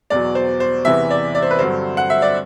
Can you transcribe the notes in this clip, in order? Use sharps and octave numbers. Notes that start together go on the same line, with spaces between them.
E2 B2 F#3 D5
C5
C5
E2 C3 E3 B3 E5
D5
D5
C5
B4
G2 D3 F#3 C4 C5
F#5
E5
D5